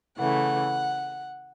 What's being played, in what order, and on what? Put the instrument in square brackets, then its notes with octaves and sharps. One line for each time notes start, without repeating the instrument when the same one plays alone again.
[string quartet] C#3 E3 A3 F#5